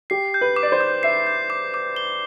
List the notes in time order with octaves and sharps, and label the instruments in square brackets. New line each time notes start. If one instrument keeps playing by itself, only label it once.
[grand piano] G4 [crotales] C7
[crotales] G6
[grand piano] B4
[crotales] D6
[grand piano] D5
C5
[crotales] D6
[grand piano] E5 [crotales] C7
[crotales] G6
D6
D6
G7